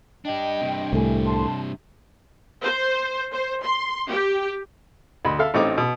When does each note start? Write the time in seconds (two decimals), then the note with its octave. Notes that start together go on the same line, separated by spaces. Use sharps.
0.25 D4 G4 D#5 G5
0.61 G2 C3
0.93 C2 A2 A3 G#5
1.25 A5 C6
2.62 C5
3.32 C5
3.63 C6
4.10 G4
5.25 D2 D#5 B5
5.39 A4 E5 F5
5.54 A1 A3 C4 D#4 D6
5.78 B2